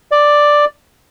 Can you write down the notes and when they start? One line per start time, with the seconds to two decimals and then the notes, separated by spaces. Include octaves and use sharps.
0.11 D5